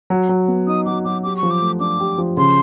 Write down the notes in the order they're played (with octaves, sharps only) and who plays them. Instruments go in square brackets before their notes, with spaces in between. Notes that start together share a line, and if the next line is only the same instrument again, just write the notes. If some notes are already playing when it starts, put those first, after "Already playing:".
[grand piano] F#3
F#3
B3
[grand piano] D#4 [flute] D#6
[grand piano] F#3 [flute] D6
[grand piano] F#3 [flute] D6
[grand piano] G4 [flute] D6
[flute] C#6
[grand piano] F3
[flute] D6
[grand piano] A3
[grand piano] D4 [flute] D6
[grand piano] G4
F3
[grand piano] C#3 [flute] C6